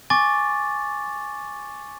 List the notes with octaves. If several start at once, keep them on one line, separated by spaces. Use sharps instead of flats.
G#5 C#6 D6 A6